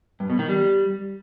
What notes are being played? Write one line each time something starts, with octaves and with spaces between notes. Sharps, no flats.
G2
B2
D#3
G3